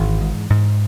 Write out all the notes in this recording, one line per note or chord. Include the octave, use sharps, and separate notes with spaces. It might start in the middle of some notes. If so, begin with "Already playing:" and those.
Already playing: G#1 E3
G#2
G#2